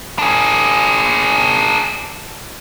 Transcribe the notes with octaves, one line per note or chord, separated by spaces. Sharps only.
D4 G#4